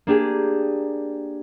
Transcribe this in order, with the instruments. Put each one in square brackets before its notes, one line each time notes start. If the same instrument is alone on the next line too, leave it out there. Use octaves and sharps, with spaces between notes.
[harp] A#3 D4 G4 G#4